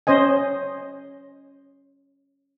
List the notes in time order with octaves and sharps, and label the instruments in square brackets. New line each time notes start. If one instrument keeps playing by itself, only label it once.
[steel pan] C#4 C5 D#5 G#5